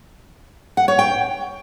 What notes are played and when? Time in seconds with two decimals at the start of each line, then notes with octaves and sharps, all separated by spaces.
0.77 F#5
0.88 C#5
0.99 G5